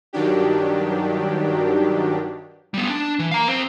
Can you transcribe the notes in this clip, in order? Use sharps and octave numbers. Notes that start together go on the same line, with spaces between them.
G2 D#3 F#3 D4 G4
G3 B3
D4
E3
F5 A#5
F2 C4